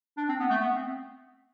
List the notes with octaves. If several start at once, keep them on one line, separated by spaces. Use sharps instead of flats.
D4
C4
B3
A3
B3
C4